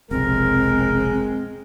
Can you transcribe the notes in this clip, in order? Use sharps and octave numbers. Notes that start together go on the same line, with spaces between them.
F1 B1 G#3 C4 A#4